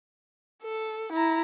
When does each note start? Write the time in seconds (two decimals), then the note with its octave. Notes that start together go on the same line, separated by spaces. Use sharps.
0.63 A4
1.12 E4 A#5